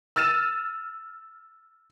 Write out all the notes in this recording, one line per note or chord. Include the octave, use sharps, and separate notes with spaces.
E6 F6 A6 D#7 E7